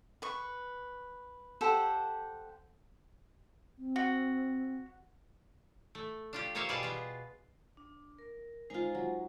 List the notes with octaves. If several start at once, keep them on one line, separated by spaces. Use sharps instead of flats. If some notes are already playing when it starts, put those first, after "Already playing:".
B4 C#6
G4 A4 C5 F#5
C4
F#4
A3
D4 F4 G4
A#3 F4 C5 C#5 E5 F5
B2 G3 G#4 D5 F5 A5
B3 F4
D4
A#4
G#3 D#4 F4 C5 G#5
F#3